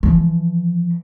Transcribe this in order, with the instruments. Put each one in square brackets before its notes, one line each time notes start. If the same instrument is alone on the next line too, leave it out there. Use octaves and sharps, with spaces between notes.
[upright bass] E3 F3